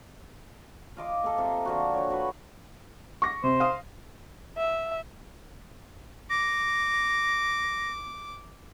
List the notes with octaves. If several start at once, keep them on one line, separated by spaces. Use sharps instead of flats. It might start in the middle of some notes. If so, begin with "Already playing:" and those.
F4 D#5 D6
A#3 A4
C3
D3 F3 F#4
C#5 G5
F#4 B4 B5
C#6 D6 A#6
C3 C5
F5 D#6
E5
D6 A#6